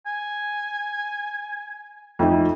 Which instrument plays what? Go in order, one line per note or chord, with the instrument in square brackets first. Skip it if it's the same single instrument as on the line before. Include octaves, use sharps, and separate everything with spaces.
[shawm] G#5
[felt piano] F2 A3 D#4